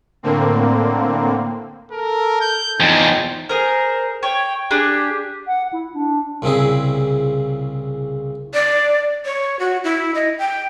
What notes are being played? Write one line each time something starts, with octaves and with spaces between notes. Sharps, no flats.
A2 D3 A#3 C4
A4 A#4
G6
E2 F3 D#4 G5
G#4 A#4 C5
C#5 G5
D4 G4 G#4
F#5
E4
D4
C2 A#2 C#3 C4 E4 G#4
D5
C#5
F#4
E4
D#5
G5